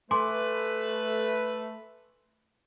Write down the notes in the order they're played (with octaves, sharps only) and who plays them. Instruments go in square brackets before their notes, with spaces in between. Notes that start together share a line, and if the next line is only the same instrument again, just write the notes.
[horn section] A3 [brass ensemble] B4 [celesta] G#5 C6 D6